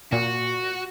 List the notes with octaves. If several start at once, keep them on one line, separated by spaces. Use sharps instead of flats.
A#2 F#4